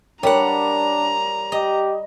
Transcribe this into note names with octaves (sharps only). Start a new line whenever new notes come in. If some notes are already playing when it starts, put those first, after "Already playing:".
G3 D4 A#4 C#5 F#5 A#5
G4 D#5